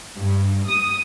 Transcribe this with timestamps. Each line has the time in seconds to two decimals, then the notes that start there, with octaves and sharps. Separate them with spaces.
0.17 G2
0.67 D#6